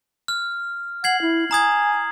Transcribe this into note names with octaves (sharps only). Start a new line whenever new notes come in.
F6
F#5 G#6 C7 F#7
E4
G#5 A#5 D#6 G#6